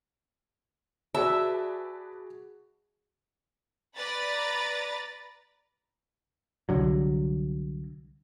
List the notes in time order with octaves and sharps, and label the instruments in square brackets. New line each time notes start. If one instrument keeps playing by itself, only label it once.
[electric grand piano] F#4 G#4 [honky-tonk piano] B4 D5 A5 [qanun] E5
[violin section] B4 D5 A#5 B5 A6
[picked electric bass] C2 D3 F#3